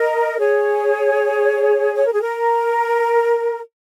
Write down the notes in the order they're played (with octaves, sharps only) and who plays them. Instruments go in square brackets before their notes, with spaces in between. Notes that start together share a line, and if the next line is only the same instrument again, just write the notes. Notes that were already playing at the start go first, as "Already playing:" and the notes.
Already playing: [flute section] A#4 D#5
G#4 C#5
C#5
A#4
G#4
A#4